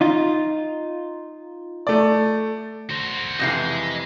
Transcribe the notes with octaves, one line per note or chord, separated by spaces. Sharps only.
D#4 F4
A3 D5
F#4 C5
F2 C3 E3 D#5 G#5